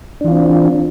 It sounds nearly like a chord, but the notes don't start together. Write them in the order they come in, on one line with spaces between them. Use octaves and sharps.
D4 E3 F4 C4